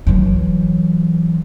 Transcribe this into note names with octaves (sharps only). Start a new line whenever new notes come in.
E3 F#3